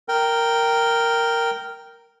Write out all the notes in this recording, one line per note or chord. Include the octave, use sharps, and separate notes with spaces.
A#4 G5